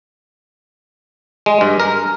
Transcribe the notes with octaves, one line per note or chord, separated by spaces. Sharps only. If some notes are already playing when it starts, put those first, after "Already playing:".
G#3
G2
A#4